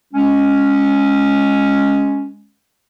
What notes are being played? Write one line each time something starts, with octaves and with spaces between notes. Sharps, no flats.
G#3 C#4